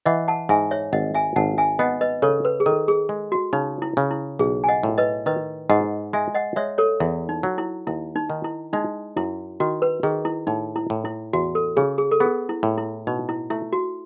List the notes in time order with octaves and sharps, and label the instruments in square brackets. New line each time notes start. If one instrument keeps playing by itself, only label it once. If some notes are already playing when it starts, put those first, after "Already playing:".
[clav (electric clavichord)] E3 [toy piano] D#5 F#5
[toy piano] F#5 A5
[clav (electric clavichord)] G#2 [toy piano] E5 G#5
[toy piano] C#5 E5
[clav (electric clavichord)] G#1 [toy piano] D#5 F#5
[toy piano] E5 G#5
[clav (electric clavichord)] G#1 [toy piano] F#5 A5
[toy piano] E5 G#5
[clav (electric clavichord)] B3 [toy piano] D#5 F#5
[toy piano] B4 D#5
[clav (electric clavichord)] C#3 [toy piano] A4 C#5
[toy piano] B4
G#4
[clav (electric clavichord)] D#3 [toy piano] A4
[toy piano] G#4
[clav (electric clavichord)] G#3
[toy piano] F#4
[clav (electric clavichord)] C#3 [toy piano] D#4
[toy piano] E4
[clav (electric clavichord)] C#3
[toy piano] E4
[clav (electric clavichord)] B1 [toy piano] G#4
[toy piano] G#5
D#5 F#5
[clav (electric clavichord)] A2
[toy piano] B4 D#5
[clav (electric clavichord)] D#3 [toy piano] B4 D#5
[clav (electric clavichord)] G#2 [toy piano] D#5 F#5
[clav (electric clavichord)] G#3 [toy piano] E5 G#5
[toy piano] D#5 F#5
[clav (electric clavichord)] G#3 [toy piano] C#5 E5
[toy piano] A4 C#5
[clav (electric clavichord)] E2 [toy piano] E4
[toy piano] D#4
[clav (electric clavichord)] F#3
[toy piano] E4
[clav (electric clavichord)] D#2 [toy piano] E4
[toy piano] D#4
[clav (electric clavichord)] D#3
[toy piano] E4
[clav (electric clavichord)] G#3 [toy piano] D#4
[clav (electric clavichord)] F#2 [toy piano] E4
[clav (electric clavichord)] D#3 [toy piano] F#4
[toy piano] B4
[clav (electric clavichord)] D#3 [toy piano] G#4
[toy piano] E4
[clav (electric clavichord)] A2 [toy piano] D#4
[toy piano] E4
[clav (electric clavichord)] A2
[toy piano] E4
[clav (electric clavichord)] E2 [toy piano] F#4
[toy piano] A4
[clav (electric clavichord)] C#3 [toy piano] G#4
[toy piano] G#4
A4
[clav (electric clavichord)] B3 [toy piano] G#4
[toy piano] E4
[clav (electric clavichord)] A2
[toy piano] E4
[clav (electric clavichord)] B2 [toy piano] D#4
[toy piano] E4
[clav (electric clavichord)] A3 [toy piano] E4
[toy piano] F#4